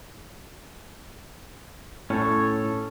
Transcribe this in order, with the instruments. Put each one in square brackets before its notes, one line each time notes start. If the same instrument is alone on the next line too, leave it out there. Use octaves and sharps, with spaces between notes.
[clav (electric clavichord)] A2 [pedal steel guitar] C#4 A4 C#5